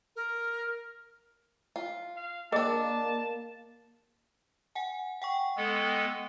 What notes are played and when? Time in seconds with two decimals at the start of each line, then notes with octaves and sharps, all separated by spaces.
0.15 A#4
1.76 F4
2.16 F5
2.52 A#3 D4 G#4 A#4 D5 D#5 A5
4.75 F#5 G#5
5.22 F#5 G5 C#6
5.57 G#3 B3 A4